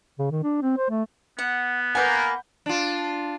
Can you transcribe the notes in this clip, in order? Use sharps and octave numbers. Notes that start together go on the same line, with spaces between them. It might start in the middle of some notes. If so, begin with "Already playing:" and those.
C#3
D#3
D4
C4
C5
A3
B3 F#5
A#3 A#4 B4 F#5 G#5 B5 G6
D4 F4